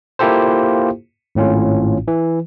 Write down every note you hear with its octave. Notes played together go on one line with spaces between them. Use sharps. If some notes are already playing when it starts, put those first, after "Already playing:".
A#3 E4 F4 G4 A4 C5
G#1 A2 C#4 F4
E3